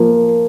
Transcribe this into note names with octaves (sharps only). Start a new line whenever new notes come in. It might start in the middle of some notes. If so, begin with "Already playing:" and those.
Already playing: F3 A#3